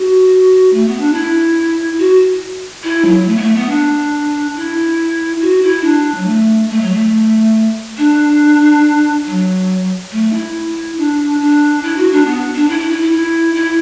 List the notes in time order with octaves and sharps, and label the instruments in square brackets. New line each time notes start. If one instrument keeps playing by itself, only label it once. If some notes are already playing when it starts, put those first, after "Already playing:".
Already playing: [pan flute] F#4
A3
B3
D4
E4
F#4
E4
F#3
A3
B3
A3
B3
D4
E4
F#4
E4
D4
F#3
A3
A3
F#3
A3
D4
F#3
A3
E4
D4
D4
E4
F#4
D4
B3
D4
E4
E4
E4
E4
E4
E4